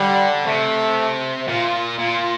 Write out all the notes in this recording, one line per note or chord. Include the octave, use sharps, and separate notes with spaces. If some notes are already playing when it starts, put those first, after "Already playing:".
Already playing: D3 G3
C3 A3
A#2 F4
A#2 F4